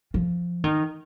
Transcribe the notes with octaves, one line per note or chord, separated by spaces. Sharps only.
F3
D#3